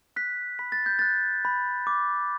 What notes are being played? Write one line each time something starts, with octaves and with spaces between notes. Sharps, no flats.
F#6 B6
B5 B6
A6
G6
F#6 A6
B5
D6